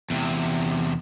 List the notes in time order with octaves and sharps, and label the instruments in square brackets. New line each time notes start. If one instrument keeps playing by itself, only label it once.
[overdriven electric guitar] E2 C3